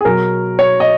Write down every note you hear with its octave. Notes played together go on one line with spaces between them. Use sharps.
G#4
B2 F#3 A#4
C#5
D#5